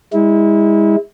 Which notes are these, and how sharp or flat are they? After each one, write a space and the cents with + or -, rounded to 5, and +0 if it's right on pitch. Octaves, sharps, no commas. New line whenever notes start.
G#3 -35 E4 -30